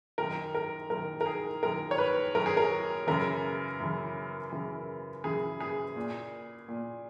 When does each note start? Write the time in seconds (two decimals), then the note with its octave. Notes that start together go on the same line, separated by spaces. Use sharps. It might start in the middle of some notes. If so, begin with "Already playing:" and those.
0.18 F#2 D#3 A#4
0.55 A#4
0.90 F#2 D#3 A#4
1.21 A#4
1.26 G#4
1.63 F#2 D#3 A#4
1.91 C#5
1.98 B4
2.35 F#2 D#3 A#4
2.46 G#4
2.57 A#4
3.07 F#2 C#3 E3 A#4
3.80 F#2 C#3 E3
4.52 F#2 C#3 E3
5.24 F#2 C#3 E3 G#4
5.60 G#4
5.96 A#2
6.69 A#2